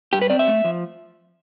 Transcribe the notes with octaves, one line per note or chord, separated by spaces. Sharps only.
G2 G4
B4
C4 D5
E5
A3
F3